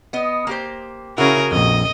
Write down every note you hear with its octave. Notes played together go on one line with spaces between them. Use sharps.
B3 D#5
A#3 G4 C5
C#3 C#4 E4 F#4 G#4 A#4
A#1 F2 D#5